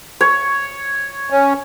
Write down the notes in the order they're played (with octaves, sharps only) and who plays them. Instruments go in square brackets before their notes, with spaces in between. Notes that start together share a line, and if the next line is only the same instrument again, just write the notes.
[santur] C#5
[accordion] C#4